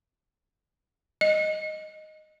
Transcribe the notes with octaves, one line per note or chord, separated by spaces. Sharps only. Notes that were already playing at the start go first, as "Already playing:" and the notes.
D#5